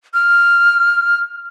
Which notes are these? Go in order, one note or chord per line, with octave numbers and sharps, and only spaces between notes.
F6